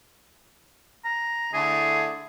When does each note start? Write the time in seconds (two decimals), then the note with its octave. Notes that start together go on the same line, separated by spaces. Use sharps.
1.04 A#5
1.53 D3 A3 E4 G#4